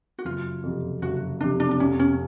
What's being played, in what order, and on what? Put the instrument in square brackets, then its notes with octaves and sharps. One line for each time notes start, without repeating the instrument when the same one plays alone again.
[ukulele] F#4
[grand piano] F#1 [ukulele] F4
[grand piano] F2 C3
[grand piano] F#1 [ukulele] F#4
[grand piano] F2 C3 [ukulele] D4
[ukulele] D4
D4
[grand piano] F1 [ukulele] C#4
[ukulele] C#4